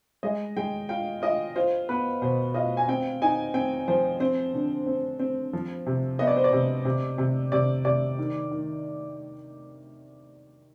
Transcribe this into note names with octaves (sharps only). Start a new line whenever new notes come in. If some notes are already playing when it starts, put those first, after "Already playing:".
G#3 D#5
G#3 G5
F4 G5
F4 D#5
F4 C5
B3 B4
B2 C5
F4 D#5
G#5
C4 G5
D#4 G#5
C4 G5
F3 C5
C4 C5
D3
C4
C4
F3
C3
B3 D#5
D5
C5
D5
C3
C3
C3
C3 D5
C3 D5
D#3
D#3